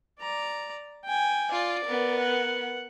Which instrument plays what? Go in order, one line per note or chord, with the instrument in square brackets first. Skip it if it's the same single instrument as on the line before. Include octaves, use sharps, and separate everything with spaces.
[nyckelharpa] D5 A#5
G5 G#5
[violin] F4 [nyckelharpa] D5
[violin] B3 A#4
[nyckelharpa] F#5